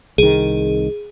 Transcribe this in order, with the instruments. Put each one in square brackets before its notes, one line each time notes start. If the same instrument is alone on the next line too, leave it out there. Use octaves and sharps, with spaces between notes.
[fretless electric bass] C2 D#3 [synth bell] G#4